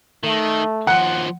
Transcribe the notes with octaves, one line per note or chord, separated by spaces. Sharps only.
D#3 A3
D#2 F3 F#5